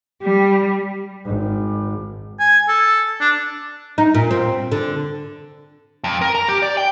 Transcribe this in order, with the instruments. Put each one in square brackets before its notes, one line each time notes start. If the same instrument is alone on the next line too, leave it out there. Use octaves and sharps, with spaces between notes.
[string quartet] G3
[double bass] G#1
[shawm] G#5
A4
D4
[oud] D#4
A#2
C4
D3
[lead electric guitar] F2
A#4
A#5
G4
D5
G5